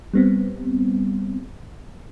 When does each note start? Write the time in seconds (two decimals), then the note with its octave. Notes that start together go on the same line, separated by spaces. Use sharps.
0.14 G3 B3 C4